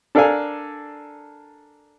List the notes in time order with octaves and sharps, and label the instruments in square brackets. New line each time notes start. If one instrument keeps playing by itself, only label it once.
[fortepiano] D4 A4 A#4 D5 F5 G#5